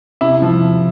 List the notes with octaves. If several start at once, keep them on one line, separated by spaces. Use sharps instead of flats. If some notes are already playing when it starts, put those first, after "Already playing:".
C3 E4
F3